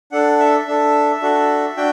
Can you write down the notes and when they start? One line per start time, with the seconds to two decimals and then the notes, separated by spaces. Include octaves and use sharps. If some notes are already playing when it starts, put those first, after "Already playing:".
0.12 D4 A4 F#5
0.39 E5
0.68 D4 A4
1.21 D4 F#4 A4
1.77 D4 F#4 G5